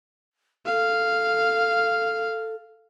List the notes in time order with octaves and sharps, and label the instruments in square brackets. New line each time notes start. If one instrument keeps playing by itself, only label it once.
[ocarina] A4 [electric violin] F5